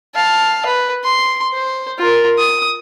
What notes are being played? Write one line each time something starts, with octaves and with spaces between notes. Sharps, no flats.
F5 A5
B4
C6
C5
F4 A#4
D#6